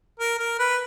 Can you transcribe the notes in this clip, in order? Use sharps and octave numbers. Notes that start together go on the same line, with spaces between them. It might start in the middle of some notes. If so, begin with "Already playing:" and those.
A#4
A#4
B4